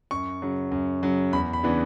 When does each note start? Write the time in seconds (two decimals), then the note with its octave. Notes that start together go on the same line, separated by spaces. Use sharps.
0.11 F#2 C#6
0.42 C#3 F#3
0.72 F#2
1.03 C#3 F#3
1.32 E2 B5
1.53 B5
1.63 C#3 E3 B3 D4